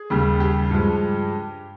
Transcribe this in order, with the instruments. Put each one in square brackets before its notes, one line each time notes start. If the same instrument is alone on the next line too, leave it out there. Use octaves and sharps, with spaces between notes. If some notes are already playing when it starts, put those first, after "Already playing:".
Already playing: [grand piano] G#4
D#2 C#3 G3
G4
G2 F3 G#3